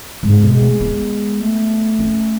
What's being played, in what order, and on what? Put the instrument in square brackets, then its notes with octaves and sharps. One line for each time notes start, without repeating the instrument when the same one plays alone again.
[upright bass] G#2 [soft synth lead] C#3
[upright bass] B2
[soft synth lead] G#3
[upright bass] A3
B3
[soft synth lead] A3
[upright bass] C#4